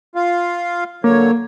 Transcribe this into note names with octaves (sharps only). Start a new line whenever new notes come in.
F4 F5
D3 F#3 A#3 C#5